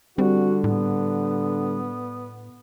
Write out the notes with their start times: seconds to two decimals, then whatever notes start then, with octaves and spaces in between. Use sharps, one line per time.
0.18 D3 G3 C4 F#4
0.64 A2 B3